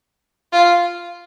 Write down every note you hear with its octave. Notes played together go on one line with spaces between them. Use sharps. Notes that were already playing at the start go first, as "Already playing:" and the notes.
F4